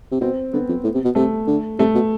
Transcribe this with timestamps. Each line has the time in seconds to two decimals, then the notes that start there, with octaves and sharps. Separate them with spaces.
0.12 C3
0.21 B2 C4
0.53 D3 B3
0.69 F2
0.84 A2
0.95 C3
1.05 B2
1.15 C3 A3
1.47 D3
1.79 C3 A3
1.95 B2